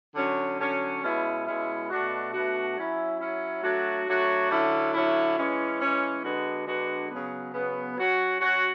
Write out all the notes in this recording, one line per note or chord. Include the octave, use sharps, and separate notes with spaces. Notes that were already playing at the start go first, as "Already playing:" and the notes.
D3 F#3 C#4
D3 F#3 C#4
B2 G#3 C#4 E4
B2 G#3 C#4 E4
B2 A3 D4 F#4
B2 A3 D4 F#4
F#3 C#4 E4
F#3 C#4 E4
F#3 A3 D4 F#4
F#3 A3 D4 F#4
D3 F#3 C#4 E4
D3 F#3 C#4 E4
E3 G#3 C#4
E3 G#3 C#4
D3 G#3 B3 D4 F#4
D3 G#3 B3 D4 F#4
C#3 F#3 B3
C#3 F#3 B3
F#3 C#4 F#4
F#3 C#4 F#4